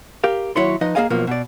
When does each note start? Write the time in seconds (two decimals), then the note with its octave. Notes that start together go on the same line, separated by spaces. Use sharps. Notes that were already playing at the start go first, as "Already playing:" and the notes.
0.24 G4 A#4 F5
0.56 D#2 F#3 E4 C#5 C6
0.81 F3 D#4 B4 D#5
0.95 A#3 E4 G#4 D#5 F5 G#5
1.10 B1 B2 F3 A#3
1.27 B2 D5